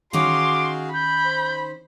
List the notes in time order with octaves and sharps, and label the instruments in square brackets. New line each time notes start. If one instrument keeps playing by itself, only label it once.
[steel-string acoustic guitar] D#3 C#4 D#4 [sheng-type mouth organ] F#4 G#4 F5 [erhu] C6 [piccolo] D6
[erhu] B5 [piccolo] G6
[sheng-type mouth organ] C5